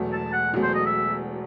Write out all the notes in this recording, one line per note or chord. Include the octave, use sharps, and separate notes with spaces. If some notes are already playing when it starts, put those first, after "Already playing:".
Already playing: E1 E2 B2 F#3 A3
A5
F#5
E1 E2 B2 F#3 A3
C5
D#5
E5